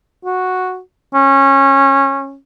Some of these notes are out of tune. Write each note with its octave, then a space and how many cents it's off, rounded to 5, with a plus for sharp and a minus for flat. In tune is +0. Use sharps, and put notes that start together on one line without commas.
F#4 -5
C#4 -20